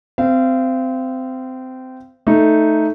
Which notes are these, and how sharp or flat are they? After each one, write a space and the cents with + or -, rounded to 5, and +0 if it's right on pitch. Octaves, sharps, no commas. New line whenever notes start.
C4 -20 F5 -35
A3 +0 D#4 +0